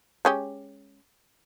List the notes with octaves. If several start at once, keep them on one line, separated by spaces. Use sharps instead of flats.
G#3 C#4 G4